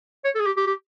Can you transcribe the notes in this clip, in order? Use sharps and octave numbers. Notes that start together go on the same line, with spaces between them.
C#5
A4
G#4
G4
G4
G4